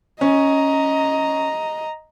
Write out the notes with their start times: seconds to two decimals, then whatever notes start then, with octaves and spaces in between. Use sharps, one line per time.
0.21 C#4 D#5 A#5